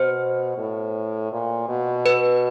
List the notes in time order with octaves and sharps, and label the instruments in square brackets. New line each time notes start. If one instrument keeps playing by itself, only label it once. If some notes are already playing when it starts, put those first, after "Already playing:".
Already playing: [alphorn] B2 [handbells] C5
[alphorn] A2
A#2
B2
[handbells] B4